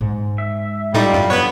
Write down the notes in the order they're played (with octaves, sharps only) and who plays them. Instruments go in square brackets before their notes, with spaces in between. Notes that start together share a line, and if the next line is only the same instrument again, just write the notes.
[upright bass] G#2 G#3
[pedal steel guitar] E5
[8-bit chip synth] A2 A3 D#4 [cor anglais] G3 [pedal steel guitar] F4
[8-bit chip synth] F#2
[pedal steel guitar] D3 F#5 [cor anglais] B3 [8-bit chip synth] B4 C#5